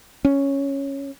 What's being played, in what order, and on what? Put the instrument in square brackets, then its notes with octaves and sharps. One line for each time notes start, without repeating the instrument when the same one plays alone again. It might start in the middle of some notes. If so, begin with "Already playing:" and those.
[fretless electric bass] C#4